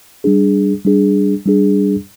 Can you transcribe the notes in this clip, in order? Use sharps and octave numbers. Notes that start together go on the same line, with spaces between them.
G3 D4 G#4
G3 D4 G#4
G3 D4 G#4